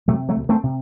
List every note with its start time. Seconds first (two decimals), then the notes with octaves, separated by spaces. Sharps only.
0.08 C3 F#3 A3
0.29 F#3 A3
0.36 D2
0.49 A3 C4
0.63 C3